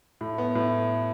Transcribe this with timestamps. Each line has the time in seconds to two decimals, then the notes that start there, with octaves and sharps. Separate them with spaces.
0.21 A2
0.38 B3
0.55 A2